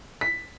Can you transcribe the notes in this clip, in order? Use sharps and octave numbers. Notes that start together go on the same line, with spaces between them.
B6